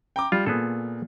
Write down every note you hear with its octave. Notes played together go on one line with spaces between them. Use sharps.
G5 A#5 D6
G3 F4
A#2 B3 G#4 A4